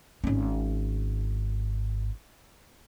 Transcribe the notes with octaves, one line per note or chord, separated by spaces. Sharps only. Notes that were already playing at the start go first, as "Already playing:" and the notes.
G#1 C#4